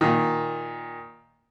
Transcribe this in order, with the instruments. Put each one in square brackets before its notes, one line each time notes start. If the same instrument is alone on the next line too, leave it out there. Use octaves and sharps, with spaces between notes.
[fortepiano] A#2 D#3